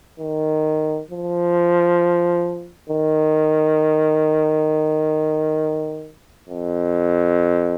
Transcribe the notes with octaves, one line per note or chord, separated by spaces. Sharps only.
D#3
F3
D#3
F2